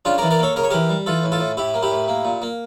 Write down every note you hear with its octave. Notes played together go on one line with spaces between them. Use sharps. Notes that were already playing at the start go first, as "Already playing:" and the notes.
C#3 D4 F4
A#4 D5
E3
A#4 D5
A#3 A4 C#5
C#3 A#4
C#5
E3 G4 A#4
G3
E3 F4 A4
A2
F4 A4
A2
A2 E4 G4
A#3
E4 G4
A2
A#3
A#2
A#3